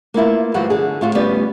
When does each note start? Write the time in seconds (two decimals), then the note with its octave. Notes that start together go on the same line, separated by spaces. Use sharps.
0.14 A#3 B3 E4 F4
0.54 D2 G2 E3 F3 F#4 F#5
0.70 E2 D3 G#4
1.01 A2 F4 F#4
1.15 D2 G3 B3 C#4 B4 D5